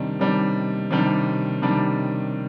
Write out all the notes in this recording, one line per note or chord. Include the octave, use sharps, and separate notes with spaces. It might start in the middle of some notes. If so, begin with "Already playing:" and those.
Already playing: C3 D#3 G3 D4
C3 D#3 G3 D4
C3 D#3 G3 D4
C3 D#3 G3 D4